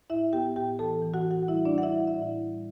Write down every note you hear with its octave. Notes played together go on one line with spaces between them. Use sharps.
A2 E4 E5
B3 G4 G5
A2 G4 G5
E3 A4 A5
E3
F#4 F#5
A2
F#4 F#5
F#5
G3 E4 E5
D4 D5
G3
F#5
E4 E5
G3
F#5
E5
D5
A2 E4 E5
G3